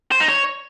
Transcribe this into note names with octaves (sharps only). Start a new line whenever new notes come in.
C5
D#4
C#5